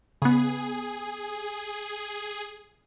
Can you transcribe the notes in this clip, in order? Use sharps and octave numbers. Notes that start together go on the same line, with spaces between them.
C#3 B3 G#4